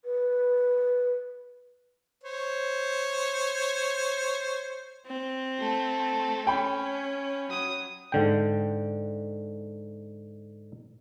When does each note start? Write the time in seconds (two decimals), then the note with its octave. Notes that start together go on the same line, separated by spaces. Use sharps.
0.05 B4
2.24 C5 C#5
5.06 C4
5.59 A3 A4
6.47 C#4 G5 B5
7.50 F#3 D#6
8.12 G#2 D3 G5